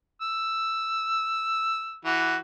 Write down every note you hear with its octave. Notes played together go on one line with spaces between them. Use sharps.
E6
E3 F#4